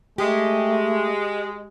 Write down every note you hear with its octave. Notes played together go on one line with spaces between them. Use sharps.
G#3 A3 G4